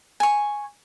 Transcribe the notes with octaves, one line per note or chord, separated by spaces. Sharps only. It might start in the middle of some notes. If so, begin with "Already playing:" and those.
G#5 C#6